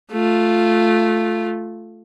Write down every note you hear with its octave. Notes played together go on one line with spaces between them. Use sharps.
A3 F4